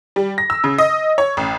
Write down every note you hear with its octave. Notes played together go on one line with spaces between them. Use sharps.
G3
A#6
E6
C#3
D#5
C#5
A1